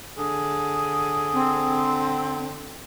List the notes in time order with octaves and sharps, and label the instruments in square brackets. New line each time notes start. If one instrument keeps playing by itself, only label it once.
[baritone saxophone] D3 [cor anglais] G#4
[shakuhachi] C4